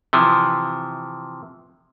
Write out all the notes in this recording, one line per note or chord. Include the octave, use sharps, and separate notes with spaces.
C3 E3 F3